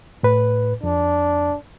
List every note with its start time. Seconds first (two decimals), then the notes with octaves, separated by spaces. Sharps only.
0.23 A2 B4
0.83 F2 D4